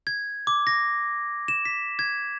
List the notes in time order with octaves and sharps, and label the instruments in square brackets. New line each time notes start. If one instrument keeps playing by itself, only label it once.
[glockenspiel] G#6
D6
A#6
E7
B6
G#6